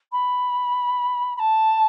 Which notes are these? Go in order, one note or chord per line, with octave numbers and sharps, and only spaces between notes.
B5
B5
A5